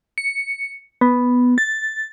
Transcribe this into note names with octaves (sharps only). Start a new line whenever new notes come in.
C#7
B3
A6